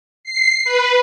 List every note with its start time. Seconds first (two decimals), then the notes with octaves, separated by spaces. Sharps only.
0.24 C7
0.65 B4